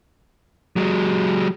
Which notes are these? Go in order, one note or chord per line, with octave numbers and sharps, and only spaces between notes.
F#3 G#3